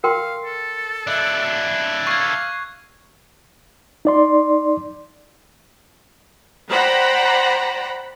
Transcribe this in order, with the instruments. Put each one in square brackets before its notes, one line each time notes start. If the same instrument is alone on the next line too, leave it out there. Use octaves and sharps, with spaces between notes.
[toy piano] A#4 G5 C6 [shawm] F5
[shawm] A4
[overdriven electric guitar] D4 E4 [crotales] F#6
[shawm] F5 [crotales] C#6 G#6
[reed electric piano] D#4 D5 C6
[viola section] C5 D5 F#5 G5 A#5 B5